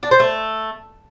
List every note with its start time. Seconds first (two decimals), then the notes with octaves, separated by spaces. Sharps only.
0.03 D4
0.11 C5
0.20 A3